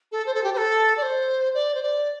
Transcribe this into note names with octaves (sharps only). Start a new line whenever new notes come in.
A4
C5
A4
G4
C5
A4
D5
C5
D5
C5
D5